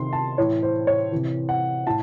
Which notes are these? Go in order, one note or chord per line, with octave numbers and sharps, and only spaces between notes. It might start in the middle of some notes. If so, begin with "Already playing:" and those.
Already playing: C3 D#3 C6
A5
A2 E3 C#5
C5
C#5
C3 E3
F#5
A2 A5